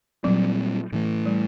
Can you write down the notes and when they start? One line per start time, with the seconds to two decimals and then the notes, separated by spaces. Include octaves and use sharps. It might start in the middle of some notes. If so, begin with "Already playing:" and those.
0.24 A#2 F#3 G3 C4
0.92 A2 E3 A3
1.26 G3